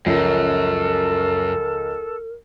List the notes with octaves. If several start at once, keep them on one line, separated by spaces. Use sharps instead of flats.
C#2 F#2 F3 C#4 A4 A#4